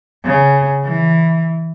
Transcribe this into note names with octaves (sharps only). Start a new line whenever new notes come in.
C#3
E3